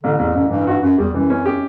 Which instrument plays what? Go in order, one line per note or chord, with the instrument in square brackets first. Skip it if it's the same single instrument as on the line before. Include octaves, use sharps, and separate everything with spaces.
[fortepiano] A1 [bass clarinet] D3
[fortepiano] A1 [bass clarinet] E2
[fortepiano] A1 [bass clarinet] F#2
[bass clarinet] G2 [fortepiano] E3
[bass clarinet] G2 [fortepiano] F#4
[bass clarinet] F#2 [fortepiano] F#4
[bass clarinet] E2 [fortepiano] G3
[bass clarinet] F#2 [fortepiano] E3
[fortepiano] C#4
G4